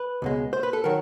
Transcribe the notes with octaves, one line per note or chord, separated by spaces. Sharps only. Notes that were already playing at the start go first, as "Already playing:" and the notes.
Already playing: B4
C#2 B2 G#3
C5
B4
A4
D#3 F#3 A#4